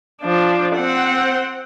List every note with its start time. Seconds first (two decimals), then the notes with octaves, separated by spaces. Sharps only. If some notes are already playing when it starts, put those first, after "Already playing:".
0.22 F3 D4
0.76 C4 F#5